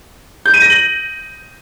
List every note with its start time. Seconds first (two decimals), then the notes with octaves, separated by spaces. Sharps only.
0.46 G6
0.54 D#7
0.62 A#6
0.70 F#7